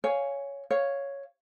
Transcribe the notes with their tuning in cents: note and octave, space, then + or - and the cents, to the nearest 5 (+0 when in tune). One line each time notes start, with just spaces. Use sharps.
C#5 +10 F5 +0 G#5 +0
C#5 +0 F5 +0